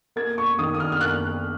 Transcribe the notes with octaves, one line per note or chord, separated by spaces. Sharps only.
A#3 G#6
C#6
D#3 D#6
D#6
F6
F6
A#3 F#6